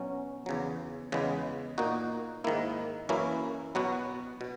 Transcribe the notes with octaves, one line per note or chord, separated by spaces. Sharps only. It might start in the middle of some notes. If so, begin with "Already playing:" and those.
Already playing: B2 F#3 C#4
E2 C#3 F#3
E2 C#3 G#3 B3
A#2 A#3 D#4 F#4
G#2 D#3 A#3 E4
F#2 E3 A#3 C#4 E4
B2 F#3 B3 F#4
B2